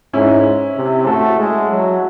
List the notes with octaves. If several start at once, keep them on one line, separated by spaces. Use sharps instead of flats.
G#2 C#4 E4
C3
A3 F#4 A4
G#3
F#3